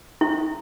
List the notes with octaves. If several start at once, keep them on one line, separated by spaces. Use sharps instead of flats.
E4